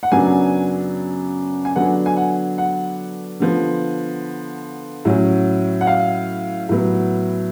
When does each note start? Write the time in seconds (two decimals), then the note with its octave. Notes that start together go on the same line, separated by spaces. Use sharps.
0.03 F#5
0.12 F#2 C#3 F#3 B3 D4 G#5
1.65 G#5
1.76 D3 F#3 B3 D4 F#5
2.06 G#5
2.17 F#5
2.58 F#5
3.40 D3 F3 B3
5.05 A2 F#3 C#4
5.81 F#5
5.87 F5
6.69 A2 F#3 B3